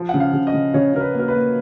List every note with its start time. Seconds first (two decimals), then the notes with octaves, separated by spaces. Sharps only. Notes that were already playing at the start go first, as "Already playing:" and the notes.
Already playing: F3
0.09 C#3 F#5
0.20 F5
0.33 C#3
0.47 D#5
0.53 C#3
0.74 C#3 C#5
0.94 C#3 A#4
1.01 B4
1.14 A#3 A#4
1.28 B4
1.35 A#3